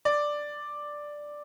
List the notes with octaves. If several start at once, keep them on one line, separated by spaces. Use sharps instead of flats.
D5